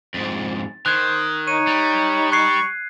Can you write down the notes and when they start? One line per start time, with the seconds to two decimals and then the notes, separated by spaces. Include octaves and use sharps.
0.14 F2 G#2 A6
0.86 D#3 C5 F#6 G#6
1.47 D#4 C#5 D#7
1.67 G3
2.32 C#6 F#6 G#6 C7